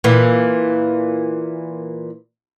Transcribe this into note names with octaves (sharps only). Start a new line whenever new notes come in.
A#2 E3